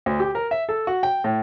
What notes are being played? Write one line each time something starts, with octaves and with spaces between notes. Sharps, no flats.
D2
G4
A#4
E5
A4
F#4
G5
A2